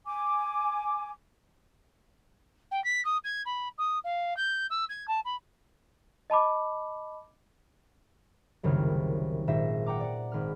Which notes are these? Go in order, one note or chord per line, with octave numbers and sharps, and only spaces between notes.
G#5 D6
G5
B6
D#6
G#6
B5
D#6
F5
G6
E6
G#6
A5
B5
D#5 A5 B5 D6
F#1 C2 D#3 C#5 F6
G#1 A#2 C5 E5 A#6
F#5 G5 A#5 D6
D5 F#5
G#1 B5 F6